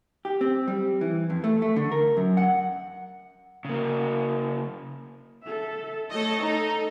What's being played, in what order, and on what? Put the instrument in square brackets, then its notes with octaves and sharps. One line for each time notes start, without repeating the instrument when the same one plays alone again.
[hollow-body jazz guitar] G4
C4
G3
E3
F2
A3
A3
D3
A#4
F#2
F#5
[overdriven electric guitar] C#3 A#3
[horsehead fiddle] A4 E5
[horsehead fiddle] A3 C#5 [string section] A4 D#5
[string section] D#4 [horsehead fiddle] A4